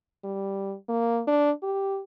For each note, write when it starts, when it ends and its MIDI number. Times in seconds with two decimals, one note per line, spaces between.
0.24 0.75 55
0.89 1.21 58
1.27 1.51 62
1.63 2.00 67